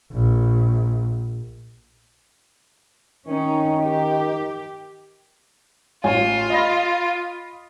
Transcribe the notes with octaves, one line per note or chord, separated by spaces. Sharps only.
A#1
D#3 C#4 D#4
G4
A1 F4 C#5 G#5
D#5 B5 A#6